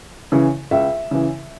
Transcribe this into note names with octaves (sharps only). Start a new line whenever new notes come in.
C#3 E3
C#2 E5
C#3 E3